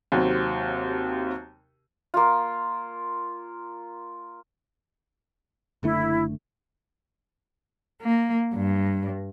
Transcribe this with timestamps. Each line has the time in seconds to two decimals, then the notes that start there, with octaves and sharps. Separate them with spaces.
0.12 D#2 C3 F#3 C4
2.14 A#3 F4
5.83 F#1 D3 A3 E4
8.02 A#3
8.55 G2